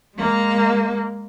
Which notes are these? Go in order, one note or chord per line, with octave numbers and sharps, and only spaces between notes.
G#3 A#3